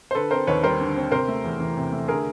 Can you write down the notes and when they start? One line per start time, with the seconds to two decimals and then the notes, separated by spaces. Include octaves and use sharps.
0.11 C5
0.15 D3 A4 B4
0.31 C4 A#4 C5
0.47 D#2 B4 C#5
0.63 G3 A#4 C5
0.80 D3
0.96 C4
1.11 C3 A#4 C5
1.28 A3
1.44 E2
1.60 E3
1.77 C3
1.92 A3
2.08 D3 G#4 A#4